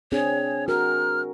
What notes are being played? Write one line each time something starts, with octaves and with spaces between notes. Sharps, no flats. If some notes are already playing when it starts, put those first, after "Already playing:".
C4 D4 G#4 C#5
F#4 A#4 F6